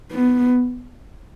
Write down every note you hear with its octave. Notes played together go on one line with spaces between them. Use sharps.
B3